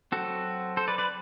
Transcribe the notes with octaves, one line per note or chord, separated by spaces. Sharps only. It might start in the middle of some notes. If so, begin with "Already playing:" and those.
F#3 C4 F#4 A4
A4 C5
B4 D5
B4 D5